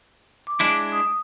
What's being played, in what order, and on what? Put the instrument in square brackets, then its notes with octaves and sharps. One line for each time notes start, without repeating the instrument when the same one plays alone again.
[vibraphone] D6
[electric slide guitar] G#3 D4 E4
[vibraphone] D#6